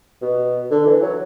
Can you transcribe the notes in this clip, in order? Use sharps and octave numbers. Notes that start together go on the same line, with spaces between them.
B2
D3
E3
F#3